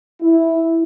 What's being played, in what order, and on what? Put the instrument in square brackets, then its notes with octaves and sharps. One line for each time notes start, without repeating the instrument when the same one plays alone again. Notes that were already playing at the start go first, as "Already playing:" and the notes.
[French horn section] E4